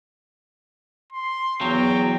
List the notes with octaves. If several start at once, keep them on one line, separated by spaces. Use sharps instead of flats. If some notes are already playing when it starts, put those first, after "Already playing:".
C6
E2 F#3 G5